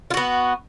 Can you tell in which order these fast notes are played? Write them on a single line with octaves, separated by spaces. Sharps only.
F4 F#4 B3